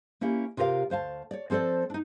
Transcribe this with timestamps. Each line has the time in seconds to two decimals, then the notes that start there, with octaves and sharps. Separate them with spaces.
0.21 A#3 C#4 E4 G4 A#4
0.57 C3 F4 G4 A#4 D#5 F5
0.90 D2 C5 F5 A5
1.31 C#5 D5
1.50 F3 C4 A4 C5 D5
1.90 D4 D#4